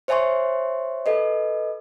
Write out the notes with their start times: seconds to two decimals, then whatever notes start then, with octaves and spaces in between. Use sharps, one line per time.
0.08 C5 C#5 E5 G#5 C6 C#6
1.06 A4 B4 D#5